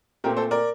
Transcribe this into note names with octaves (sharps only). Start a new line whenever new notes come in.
A#2 A3 C4 G4 A#4
A4 C5
A#4 D5